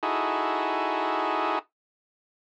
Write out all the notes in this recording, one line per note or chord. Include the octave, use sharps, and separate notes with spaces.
D#4 E4 F#4 G#4 A4